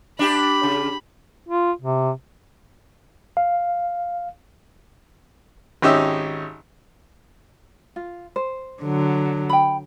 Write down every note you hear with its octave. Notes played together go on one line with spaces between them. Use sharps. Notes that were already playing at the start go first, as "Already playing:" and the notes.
D4 G4 B5
C#3
F4
C3
F5
G#1 C#4 D#4 G4 E5 E6
F4
C5
D3 F#3
G5 B5